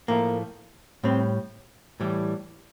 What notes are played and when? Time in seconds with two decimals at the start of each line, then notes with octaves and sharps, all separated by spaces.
0.08 A2 F3 A3 A#3
1.04 A2 G3 C4
2.00 A2 E3 G3